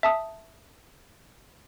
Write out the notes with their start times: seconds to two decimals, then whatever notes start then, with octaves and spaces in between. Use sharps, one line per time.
0.03 E5 A5 D#6